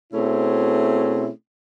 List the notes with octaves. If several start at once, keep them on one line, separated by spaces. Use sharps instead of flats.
B2 A3 C4 C#4 E4 G#4